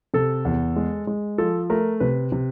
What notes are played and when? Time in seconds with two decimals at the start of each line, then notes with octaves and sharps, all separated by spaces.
0.14 C3 A4
0.45 E2
0.76 G#3
1.07 G#3
1.38 F3 A4
1.70 A3 A#4
2.00 C3 B4
2.32 C3